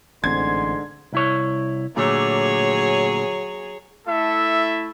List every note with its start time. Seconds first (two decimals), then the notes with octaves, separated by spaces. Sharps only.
0.24 A1 G#2 D3 C4 C6 G#6
1.13 C2 E4 C#5
1.96 A#2 D3 F#3 A3 G#4 C#5
4.07 A3 E4 A4 E5